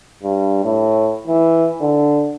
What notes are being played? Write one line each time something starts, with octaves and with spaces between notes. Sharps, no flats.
G2
A2
E3
D3